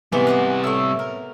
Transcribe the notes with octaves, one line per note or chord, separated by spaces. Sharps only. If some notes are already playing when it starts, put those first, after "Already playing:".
G#2 C3 E3 G3 B3 B4
D#4 F#5 F#6
A2 A3 E6
A#4